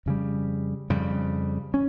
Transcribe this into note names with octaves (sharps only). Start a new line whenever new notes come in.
F2 C#3 G3
F2 C#3 G3
C#4